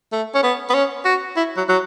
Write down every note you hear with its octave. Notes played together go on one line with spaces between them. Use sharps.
A3
C#4
B3
B3
C#4
F#4
E4
F#3
F#3